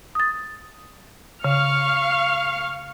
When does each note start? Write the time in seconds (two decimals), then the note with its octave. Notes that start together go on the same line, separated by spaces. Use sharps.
0.15 D#6 A6
1.44 C#3 F5 C#6 F6